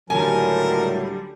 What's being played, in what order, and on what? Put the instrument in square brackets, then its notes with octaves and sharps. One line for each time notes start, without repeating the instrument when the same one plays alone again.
[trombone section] C#2 A2 F#3 [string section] D3 G3 [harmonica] A#4 A5 [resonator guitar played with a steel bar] G#5